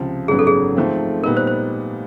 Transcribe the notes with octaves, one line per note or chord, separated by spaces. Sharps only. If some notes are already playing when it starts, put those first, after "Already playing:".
Already playing: C#2 C3 F3
G#1 F#2 C#3 F#3 B3 G#4
A4
G#4
G#2 F3 A3 C4
A#2 G3 B3 D#4 A#4
C5
C5